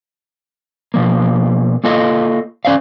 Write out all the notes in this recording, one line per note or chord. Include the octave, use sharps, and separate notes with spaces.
B2 F3 A#3
A#3 F4 A4 D#5 F5
C#4 C5 D5 F5